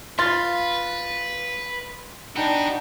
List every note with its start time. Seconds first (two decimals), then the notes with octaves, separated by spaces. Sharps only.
0.19 F4 B4 C6 A6
2.36 D4 D#4 F#4 B4 G5